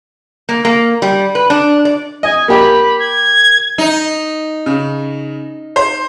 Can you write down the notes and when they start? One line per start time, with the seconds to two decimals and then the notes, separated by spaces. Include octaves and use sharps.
0.49 A#3
0.65 A#3
1.02 G3
1.35 B4
1.50 D4
1.85 D5
2.23 D#5 G#5
2.48 A#3 G4 B5
2.99 G#6
3.78 D#4
4.66 C#3
5.76 C5